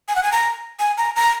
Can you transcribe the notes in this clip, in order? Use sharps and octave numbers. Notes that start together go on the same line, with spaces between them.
G#5
F#5
G#5
A#5
G#5
A#5
A#5